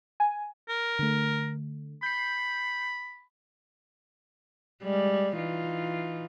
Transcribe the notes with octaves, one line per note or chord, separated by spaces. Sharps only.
G#5
A#4
D3 A3
B5 G6 C7
G3 G#3 D5
E3 D#4 F4